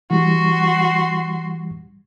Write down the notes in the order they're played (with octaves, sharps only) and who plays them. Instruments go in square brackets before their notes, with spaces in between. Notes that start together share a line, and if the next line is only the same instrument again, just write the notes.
[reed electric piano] E3 G3 [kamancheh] F#4 C6